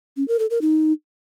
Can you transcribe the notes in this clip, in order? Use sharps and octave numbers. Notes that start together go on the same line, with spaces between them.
C#4
A#4
A4
A#4
D#4